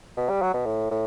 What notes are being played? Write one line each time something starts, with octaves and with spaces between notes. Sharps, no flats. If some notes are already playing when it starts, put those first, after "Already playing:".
B2
G3
F#3
B2
A2
A2